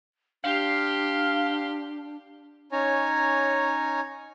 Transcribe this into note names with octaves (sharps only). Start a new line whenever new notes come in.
D4 G4 F5 C6
C#4 D#4 C#5 G#5 A#5